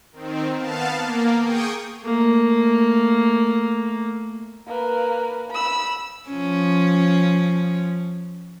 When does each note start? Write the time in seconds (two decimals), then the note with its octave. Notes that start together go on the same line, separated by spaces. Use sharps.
0.12 D#3 C4
0.58 B3 F5 A5
0.94 A#3
1.43 G#4 G5 C#6 D#6
2.03 A3 A#3
4.67 A#3 B4
5.51 B5 E6
6.29 F3 C#4